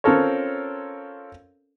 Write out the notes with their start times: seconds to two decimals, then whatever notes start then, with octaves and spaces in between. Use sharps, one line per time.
0.04 C4 C#4 F4 A4 A#4 C#5